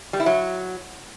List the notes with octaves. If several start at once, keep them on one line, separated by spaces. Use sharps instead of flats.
G3
E4
F#3